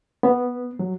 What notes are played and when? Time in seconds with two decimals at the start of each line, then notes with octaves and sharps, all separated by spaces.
0.23 B3
0.79 F#3